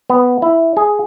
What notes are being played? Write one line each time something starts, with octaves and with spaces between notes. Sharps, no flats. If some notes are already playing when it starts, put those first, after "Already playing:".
B3
E4
G#4